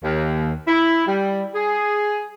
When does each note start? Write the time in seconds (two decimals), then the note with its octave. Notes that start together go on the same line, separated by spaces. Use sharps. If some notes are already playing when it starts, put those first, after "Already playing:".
0.02 D#2
0.67 E4
1.06 G3
1.53 G#4